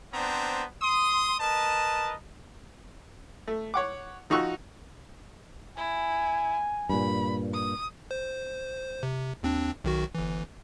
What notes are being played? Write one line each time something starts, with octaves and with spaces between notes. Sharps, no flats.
B3 C4 D4 C5 A#5
C6 D#6
A#4 B4 D#5 A5
A3
C#5 F#5 D6
F3 D#4 F#4 C#6 E6 F#6
E4 G#5
G2 A#2 B5
D#6
C5
C3
D#2 C4 D4
B1 D#3 F#4
G1 E3